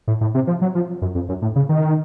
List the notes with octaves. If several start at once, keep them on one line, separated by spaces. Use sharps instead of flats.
A2
A2
C3
F3
F#3
F3
F#2
F2
F#2
A2
C#3
D#3